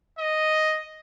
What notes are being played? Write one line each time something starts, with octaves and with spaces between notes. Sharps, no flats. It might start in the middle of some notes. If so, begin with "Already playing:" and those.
D#5